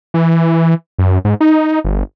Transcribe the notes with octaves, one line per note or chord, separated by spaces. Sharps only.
E3
F#2
G#2
D#4
G1